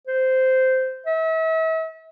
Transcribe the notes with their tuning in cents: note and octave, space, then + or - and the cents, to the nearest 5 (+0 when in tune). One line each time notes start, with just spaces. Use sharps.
C5 -10
E5 -40